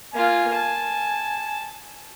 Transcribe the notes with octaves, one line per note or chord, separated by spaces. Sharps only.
A#3 F4 G#5
A5